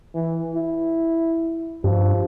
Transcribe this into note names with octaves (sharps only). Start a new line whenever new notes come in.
E3
E4
G2 F3